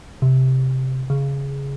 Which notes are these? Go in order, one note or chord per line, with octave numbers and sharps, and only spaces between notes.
C3
C#3